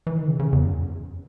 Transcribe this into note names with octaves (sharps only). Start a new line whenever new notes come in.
E3
D#3
C#3
C#3
E2
F#2